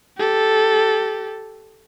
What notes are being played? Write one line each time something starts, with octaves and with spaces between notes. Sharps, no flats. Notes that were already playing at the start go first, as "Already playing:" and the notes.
G4 A4